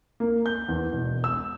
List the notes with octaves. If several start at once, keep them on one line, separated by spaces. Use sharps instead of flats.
A#3
G6
E2
E1
E6